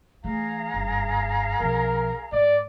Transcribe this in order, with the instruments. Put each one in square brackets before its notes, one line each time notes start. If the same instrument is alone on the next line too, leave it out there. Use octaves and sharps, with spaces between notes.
[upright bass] E3 A3 [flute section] G#4 F5 A#5
[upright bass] F#1 G2
[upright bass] B1 F3 [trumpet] A#4
[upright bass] G#2 [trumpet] D5